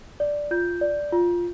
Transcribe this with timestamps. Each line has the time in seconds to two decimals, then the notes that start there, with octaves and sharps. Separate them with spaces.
0.20 D5
0.51 F4 G6
0.81 D5
1.12 F4